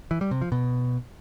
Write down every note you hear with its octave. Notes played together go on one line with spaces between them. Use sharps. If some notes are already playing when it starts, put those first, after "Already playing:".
E3
G3
C3
F3
B2